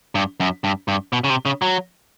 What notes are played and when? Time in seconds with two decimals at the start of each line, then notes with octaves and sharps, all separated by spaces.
0.15 G2
0.40 F#2
0.64 G2
0.88 G2
1.13 B2
1.24 C#3
1.30 C3
1.46 C#3
1.62 F#3